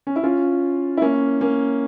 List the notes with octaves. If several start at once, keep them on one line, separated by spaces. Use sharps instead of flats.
C#4
E4
C#4 F4
E4
A#3 C#4
A#3 C#4